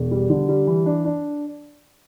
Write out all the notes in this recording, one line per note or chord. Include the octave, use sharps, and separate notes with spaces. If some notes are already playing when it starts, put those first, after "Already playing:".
Already playing: E1
G3
D3
G3
E3
D4
D4